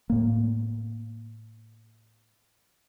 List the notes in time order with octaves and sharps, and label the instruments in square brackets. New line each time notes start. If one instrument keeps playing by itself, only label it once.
[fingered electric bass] A2 A#3